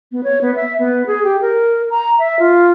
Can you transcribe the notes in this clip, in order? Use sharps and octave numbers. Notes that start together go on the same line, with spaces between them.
B3
C#5
B3
E5
B3
G#4
G4
A#4
A#5
E5
F4